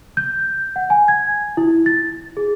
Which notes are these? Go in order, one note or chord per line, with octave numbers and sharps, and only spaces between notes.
G6
F#5
G#5
G#6
E4
A6
G#4